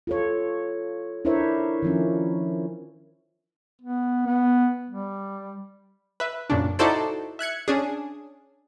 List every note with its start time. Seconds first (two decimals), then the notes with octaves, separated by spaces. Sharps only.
0.07 F4 A4 C#5
1.25 D4 E4 A#4 C5 C#5 E5
1.82 D#3 F3 C#4
3.82 B3
4.27 B3
4.90 G3
6.20 B4 E5
6.50 F#2 A#2 C#3 D4
6.79 D#4 E4 F#4 A4 C5 D5
7.39 E5 F#6 G#6 C#7
7.68 C#4 D4 G#4